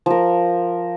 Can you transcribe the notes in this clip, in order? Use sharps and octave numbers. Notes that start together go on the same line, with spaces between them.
F3 A#4